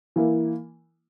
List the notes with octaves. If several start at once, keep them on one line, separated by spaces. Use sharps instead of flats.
E3 A#3 E4